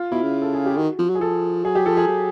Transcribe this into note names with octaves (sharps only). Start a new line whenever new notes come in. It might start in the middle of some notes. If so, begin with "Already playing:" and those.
Already playing: F4
B2 E4
C#3
A4
G#4
G4
D#3 F#4
F3
F#3
G#4
F3 A4
F#3 G#4
G4
F3 A4
G#4
F#3